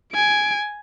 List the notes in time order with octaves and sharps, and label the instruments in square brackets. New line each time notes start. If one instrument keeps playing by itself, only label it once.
[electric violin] G#5 D7